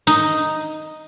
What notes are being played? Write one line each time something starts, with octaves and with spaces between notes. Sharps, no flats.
D#4